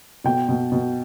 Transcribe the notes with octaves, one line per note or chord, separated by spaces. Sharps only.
B2 G5
B2
B2